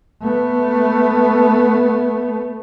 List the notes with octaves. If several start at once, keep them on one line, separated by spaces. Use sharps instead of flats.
A3 B3